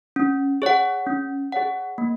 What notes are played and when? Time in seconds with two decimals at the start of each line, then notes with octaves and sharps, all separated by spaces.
0.16 C#4
0.62 G#4 C#5 F#5
1.07 C#4
1.52 G#4 C#5 F#5
1.98 A#3